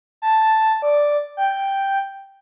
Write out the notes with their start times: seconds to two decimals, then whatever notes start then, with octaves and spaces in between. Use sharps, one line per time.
0.22 A5
0.82 D5
1.37 G5